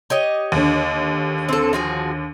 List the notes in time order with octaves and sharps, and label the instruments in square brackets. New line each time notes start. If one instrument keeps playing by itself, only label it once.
[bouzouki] G4 C#5 D#5
[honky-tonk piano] D#2 D3
[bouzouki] C4 A4
F3 F#4 G#4